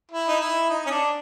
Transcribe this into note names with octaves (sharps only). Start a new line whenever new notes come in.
E4
D#4
E4
D#4
C#4
D4